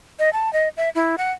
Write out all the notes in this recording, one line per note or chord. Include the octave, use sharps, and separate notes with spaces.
D#5
A5
D#5
E5
E4
F#5